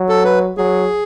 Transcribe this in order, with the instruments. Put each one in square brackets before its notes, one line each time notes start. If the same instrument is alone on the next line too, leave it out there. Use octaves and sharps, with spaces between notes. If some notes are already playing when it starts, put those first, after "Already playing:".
Already playing: [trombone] F#3
[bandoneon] A4
B4
[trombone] F#3 [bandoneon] G#4